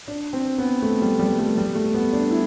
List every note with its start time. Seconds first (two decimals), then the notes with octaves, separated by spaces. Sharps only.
0.08 D4
0.33 C4
0.58 B3
0.82 A3
1.02 G3
1.19 G3
1.39 A3
1.57 G3
1.75 A3
1.94 B3
2.13 D4
2.31 E4